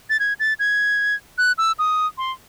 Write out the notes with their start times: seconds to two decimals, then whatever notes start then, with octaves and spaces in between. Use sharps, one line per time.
0.10 A6
0.20 G#6
0.40 A6
0.59 G#6
1.38 F#6
1.58 E6
1.79 D#6
2.18 C6